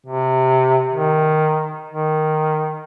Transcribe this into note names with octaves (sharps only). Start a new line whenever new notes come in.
C3
D#3
D#3